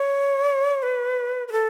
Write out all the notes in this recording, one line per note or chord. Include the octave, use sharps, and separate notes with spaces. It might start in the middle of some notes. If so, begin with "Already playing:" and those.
Already playing: C#5
B4
B4
A4